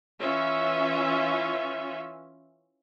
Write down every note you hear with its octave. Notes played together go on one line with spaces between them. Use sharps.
E3 C#4 F4 E5